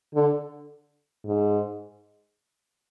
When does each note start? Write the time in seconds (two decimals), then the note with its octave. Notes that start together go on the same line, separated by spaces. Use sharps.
0.14 D3
1.25 G#2